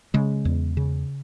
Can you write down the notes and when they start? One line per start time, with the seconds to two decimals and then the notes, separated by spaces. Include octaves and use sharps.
0.14 C#3 G#3
0.45 E2
0.77 C#3